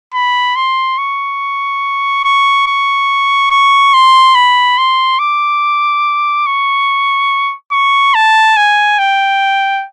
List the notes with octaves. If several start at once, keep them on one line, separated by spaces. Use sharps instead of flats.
B5
C6
C#6
C#6
C#6
C#6
C6
B5
C6
D6
C#6
C#6
A5
G#5
G5